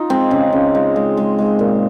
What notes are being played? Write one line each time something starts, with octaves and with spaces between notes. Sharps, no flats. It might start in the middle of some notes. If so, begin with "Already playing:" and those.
Already playing: D#4 F4
G#3 C4
C#3
C#3
G#3
G#3
G#3
G#3
A#2